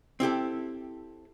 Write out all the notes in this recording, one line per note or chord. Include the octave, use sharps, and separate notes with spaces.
C4 E4 G4 A4